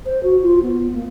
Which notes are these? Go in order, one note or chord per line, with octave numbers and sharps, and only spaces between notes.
C5
F#4
F4
B3
A#3